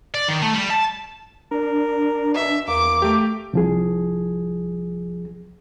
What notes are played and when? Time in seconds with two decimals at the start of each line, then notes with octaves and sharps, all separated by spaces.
0.14 D5
0.28 D#3
0.42 A3
0.54 G3
0.70 A5
1.51 D4 A#4
2.34 B2 E5
2.68 E2 A#3 D6
3.02 A3 G4
3.53 C2 F3 G#4